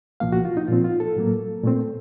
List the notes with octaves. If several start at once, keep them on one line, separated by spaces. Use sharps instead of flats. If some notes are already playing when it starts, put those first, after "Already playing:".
C2 A#2 F3 A#3 F5
F#4
F4
D#4
A#2 F3 C4 F4
F4
A4
A2 F#3 A#3
A#2 A3 C4